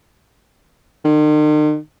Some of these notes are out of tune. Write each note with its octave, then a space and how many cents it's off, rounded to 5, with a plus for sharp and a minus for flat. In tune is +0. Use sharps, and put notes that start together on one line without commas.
D#3 -45